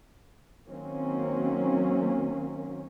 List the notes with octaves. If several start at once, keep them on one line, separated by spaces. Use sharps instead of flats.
D#3 F#3 A#3 C4 C#4